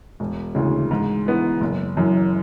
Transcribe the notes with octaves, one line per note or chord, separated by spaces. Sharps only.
E1
D2 C#3 E3
G#2
E3 B3
F#1
F#2 E3